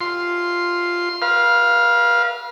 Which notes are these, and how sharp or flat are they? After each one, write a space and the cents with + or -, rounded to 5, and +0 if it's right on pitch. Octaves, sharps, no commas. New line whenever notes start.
F4 +0 C6 +0
B4 -40 F5 +0